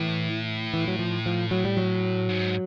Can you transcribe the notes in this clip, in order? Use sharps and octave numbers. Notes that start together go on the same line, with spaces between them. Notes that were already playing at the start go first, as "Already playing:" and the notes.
Already playing: A2 E3
E3
F#3
F3
F3
F#3
G3
F#3
G#2